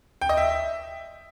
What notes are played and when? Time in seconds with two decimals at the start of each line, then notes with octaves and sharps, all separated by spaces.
0.21 G5
0.29 D#5
0.37 E5